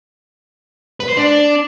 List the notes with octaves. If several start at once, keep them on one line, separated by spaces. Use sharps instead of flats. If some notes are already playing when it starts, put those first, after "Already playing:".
B4
C5
D4